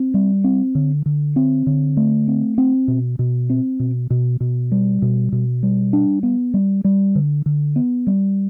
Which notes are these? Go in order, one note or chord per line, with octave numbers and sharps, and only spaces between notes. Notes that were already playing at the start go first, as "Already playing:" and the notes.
Already playing: C4
G3
C4
D3
D3
C4
D3
A3
C4
C4
B2
B2
C4
B2
B2
B2
G3
B2
B2
G3
D4
B3
G3
G3
D3
D3
B3
G3